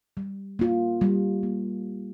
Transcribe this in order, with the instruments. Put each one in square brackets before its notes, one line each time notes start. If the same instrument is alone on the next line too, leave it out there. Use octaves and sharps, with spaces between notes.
[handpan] G3
A#3 F4
G3
A#3